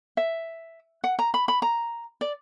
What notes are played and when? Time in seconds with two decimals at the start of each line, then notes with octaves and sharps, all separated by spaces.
0.17 E5
1.04 F#5
1.19 A#5
1.34 B5
1.48 B5
1.62 A#5
2.21 D5